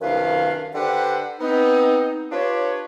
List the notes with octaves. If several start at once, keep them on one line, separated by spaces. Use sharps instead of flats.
C2 F#2 D#3 D4 B4 F5
D3 G4 B4 C5 F#5
B3 C4 D#4
D4 F4 G4 B4 C#5